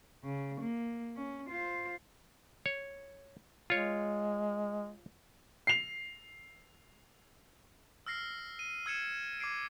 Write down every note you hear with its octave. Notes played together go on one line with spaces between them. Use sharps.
C#3
A#3
C#4
F4 C5
C#5
G#3 F4 C#5
C7 F7
E6 F6 A#6 C7
D#7
E6 G#6 C#7 E7
D6 G#6 C7 D7